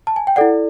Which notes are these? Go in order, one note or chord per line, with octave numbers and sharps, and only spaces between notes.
A5
G#5
G5
E4 A4 D5 F#5